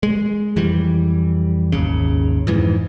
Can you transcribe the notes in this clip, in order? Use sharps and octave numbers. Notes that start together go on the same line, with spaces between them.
G#3
F2 E3 G3
G#1 D#2 C#3
F2 G#2 E3